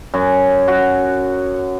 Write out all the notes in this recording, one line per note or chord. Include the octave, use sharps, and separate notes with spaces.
F#2
F#4